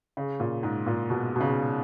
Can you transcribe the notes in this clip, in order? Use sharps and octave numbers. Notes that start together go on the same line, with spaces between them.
C#3
A#2
G#2
A#2
B2
B2
C#3